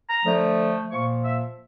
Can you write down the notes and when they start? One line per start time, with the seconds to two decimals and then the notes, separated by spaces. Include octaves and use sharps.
0.08 A#5
0.25 D3 F3 A3
0.90 A#2 F3 A#3 C#6
1.23 E5